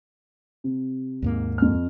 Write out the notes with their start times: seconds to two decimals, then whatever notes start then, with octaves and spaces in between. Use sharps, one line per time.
0.64 C3
1.22 D#2 G#2 A#3
1.58 F2 F6